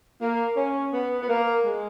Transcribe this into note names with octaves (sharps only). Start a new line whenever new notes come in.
A#3
C#4
B3
B3
A#3
G#3